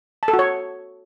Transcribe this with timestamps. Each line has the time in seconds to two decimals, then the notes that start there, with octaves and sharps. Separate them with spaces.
0.23 A5
0.28 A4
0.33 F#4
0.39 C#5